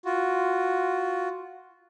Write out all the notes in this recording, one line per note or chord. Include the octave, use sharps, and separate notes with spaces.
F4 F#4